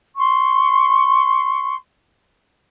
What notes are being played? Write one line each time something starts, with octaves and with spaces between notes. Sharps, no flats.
C6 C#6